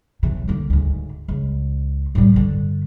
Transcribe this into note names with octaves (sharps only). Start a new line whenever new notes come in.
B1 E3
D3 A#3
D2 G#2
C#2
A2 G3
G2 D3